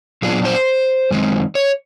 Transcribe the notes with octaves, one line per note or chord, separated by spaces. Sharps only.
A#2 F#3 B3 D4 F4 G#4
C5
F#2 D#3 G#3 C4 D#4
C#5